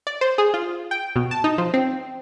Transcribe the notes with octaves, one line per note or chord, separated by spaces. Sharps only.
D5
C5
G#4
F4
G5
B2
A5
D#4
F3
C4